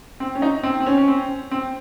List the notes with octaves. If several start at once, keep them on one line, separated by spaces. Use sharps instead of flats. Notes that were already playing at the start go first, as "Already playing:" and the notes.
C4
C#4
D#4
C4
C4
C#4
C#4
C4
C4